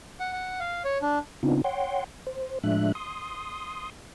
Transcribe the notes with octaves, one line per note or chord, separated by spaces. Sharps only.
F#5
F#5
F5
C#5
D4
C#3 B3 C4 D4 D#4 F4
C#5 F#5 G5 C6
C5
A2 F3 G#3 D4 E5 F#6
C6 D#6